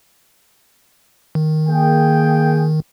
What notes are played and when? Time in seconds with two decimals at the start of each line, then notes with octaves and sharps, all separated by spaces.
1.35 D#3
1.68 A#3 G#4 G5